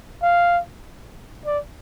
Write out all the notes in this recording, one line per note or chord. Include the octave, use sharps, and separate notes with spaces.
F5
D5